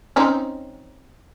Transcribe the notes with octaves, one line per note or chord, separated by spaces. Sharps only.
C4 C#4 D#4